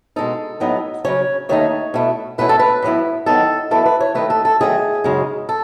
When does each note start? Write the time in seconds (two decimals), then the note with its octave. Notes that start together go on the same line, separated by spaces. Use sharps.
0.16 B2 G#3 D#4 A4
0.60 A2 F#3 B3 D#4
1.05 C#3 F#3 C#4 C#5
1.49 D#2 D#3 A3 D#4 C#5
1.94 B2 A3 E4
2.38 E2 B2 A3 C#4 E4 B4
2.49 A4
2.59 B4
2.82 A2 F#3 B3 E4
3.26 D#3 F#3 B3 D#4 A4
3.71 F#2 E3 B3 E4 A4
3.86 B4
4.00 C#5
4.15 D#2 D#3 A3 B4
4.30 A4
4.45 A4
4.60 E2 D#3 F#3 A3 G#4
5.04 F#2 C#3 G#3 D#4
5.49 A4